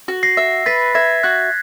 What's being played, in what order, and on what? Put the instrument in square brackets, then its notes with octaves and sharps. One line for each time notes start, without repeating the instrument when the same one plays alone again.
[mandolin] F#4
[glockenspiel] A#6 C7
[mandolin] E5
[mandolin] B4 [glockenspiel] A6 B6
[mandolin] E5 [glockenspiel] G#6 A#6
[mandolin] F#4 [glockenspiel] F#6 G#6